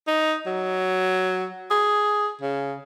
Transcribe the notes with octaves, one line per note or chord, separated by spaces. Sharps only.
D#4
F#3
G#4
C#3